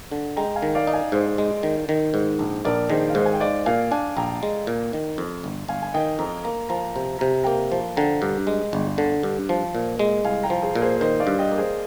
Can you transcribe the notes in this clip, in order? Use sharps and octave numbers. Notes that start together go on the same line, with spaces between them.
D3
G#3 G5 A#5
F5 G#5
D#3
D5 F5
D#4
F5 G#5
G#2 C5 D#5
G#3
D#3
D#3
G#2
A#1
A#1 A#4 D5
D#3 G#4 C5
F5
G#2 C5 D#5
G#5
G5
G#3 D5 F5
A#2 F5 G#5
D4 F5 G#5
A#1 G5 A#5
G#3
A#2
D#3
F2
G1
G1 F5 G#5
G#5
D#3 D#5 G5
F2 A#5
A#3 A#5
F3 A#5
C3 A#5
C3 A#5
A#3 G5 A#5
F3
D3 G5 A#5
G2
G#3
G1
D3
G2
F3
A#2
G#3
C2 F5 G#5
G5 A#5
F3
G#4 C5
A#2
G#4 C5
D#3 C5 D#5
D5 F5
G2
D#5 G5
A#3
G#4 C5